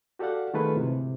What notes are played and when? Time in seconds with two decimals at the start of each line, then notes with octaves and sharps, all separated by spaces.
0.19 F#4 G4 A4 D5 F5 F#5
0.54 D#3 A3 F4 G#4 A4 B4
0.75 D2 G#2 C3 E3